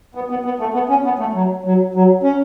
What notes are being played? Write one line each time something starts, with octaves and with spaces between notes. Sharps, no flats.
B3
B3
B3
A3
B3
C#4
B3
A3
F#3
F#3
F#3
C#4